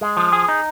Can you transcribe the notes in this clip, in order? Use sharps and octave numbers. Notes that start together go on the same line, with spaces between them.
G#3
F3
G#4
D#4